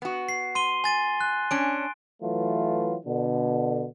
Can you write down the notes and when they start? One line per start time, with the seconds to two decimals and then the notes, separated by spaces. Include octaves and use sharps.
0.02 B3 F#4
0.29 C7
0.55 C6 D#7 G7
0.84 G#5 A6 D#7
1.21 F#6
1.51 C#4 D4 D7
2.23 E3 F#3 A3 F4 B4
3.06 B2 D3